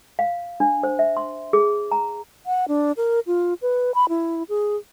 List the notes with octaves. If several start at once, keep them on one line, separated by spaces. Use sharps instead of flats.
F5
D4
C5
E5
C6
G#4
A#5
F#5
D4
A#4
F4
B4
B5
E4
G#4